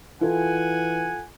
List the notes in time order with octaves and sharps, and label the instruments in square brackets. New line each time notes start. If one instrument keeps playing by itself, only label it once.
[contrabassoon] E3 [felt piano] F4 A4 [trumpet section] F#5 G#5